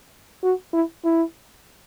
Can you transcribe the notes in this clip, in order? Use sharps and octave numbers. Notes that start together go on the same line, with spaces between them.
F#4
E4
E4